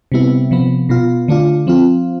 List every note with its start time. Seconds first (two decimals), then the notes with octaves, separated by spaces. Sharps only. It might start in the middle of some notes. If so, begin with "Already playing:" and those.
0.12 C3 G3 B3 E4
0.51 C3 F3 B3
0.89 B2 B3 F4
1.28 D3 A3 D4 F4
1.67 F3 C4 F4